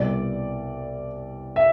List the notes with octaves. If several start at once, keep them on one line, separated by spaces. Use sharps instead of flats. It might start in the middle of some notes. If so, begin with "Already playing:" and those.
Already playing: C2 B2 D5
E5